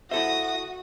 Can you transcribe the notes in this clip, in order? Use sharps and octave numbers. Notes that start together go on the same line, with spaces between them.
E4 F#4 A4 C5 E5 D#6 A#6